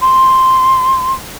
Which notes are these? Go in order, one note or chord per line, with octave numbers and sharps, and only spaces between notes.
C6